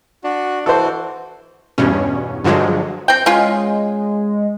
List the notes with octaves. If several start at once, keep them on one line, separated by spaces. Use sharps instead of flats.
D4 F#4
E3 F#4 A4 C5
E2 G2 B2 C#4
G2 D3 F3 F#3 G#3
C4 G5
G#3 C#4 F4